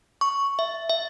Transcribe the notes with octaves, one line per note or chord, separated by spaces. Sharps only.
C#6
E5
E5